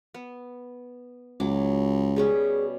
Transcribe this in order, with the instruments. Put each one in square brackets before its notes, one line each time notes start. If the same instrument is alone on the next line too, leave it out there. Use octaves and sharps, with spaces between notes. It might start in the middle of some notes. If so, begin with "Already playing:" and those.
[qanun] B3
[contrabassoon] C#2 [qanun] F#3 D6
[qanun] B2 G3 C#4 [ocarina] G#4